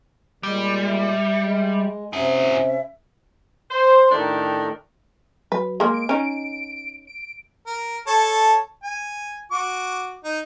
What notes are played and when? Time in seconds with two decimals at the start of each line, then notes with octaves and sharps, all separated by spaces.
0.43 A#2 G3 G#3
0.85 E5
1.42 G#3
2.13 C3 C#4 F#4 G#4 E5
3.71 C5
4.11 A2 D#3 A3 D4 G4 A#4
5.52 F#3 B4
5.80 G#3 A#3
5.94 D7
6.09 C#4 D#4
7.07 D7
7.66 A#4
8.07 A4 C#5 A5
8.83 G#5
9.52 F#4 D6
10.24 D#4